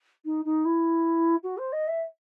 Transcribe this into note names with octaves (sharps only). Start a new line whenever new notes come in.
D#4
D#4
E4
F#4
C5
D#5
E5